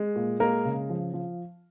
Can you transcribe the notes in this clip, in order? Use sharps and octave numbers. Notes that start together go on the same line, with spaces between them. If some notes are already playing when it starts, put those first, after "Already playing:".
Already playing: G#3
A#2
G#3 A#3 A#4
C#3
F3
F3